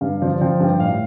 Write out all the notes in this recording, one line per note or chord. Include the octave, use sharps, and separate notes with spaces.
G2 F5
F3 D5
F3 G5
G2 G5
A2 F5